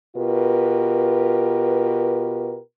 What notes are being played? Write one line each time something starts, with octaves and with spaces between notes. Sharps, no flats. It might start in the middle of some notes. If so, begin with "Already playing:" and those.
B2 F4 G4 A#4 B4